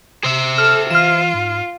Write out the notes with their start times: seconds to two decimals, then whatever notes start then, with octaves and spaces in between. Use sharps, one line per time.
0.24 C3 C5 E5
0.58 A4 F6
0.90 E3 F4 F6 E7
1.34 G#2